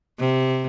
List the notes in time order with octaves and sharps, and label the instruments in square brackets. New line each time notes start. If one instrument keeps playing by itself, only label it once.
[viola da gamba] C3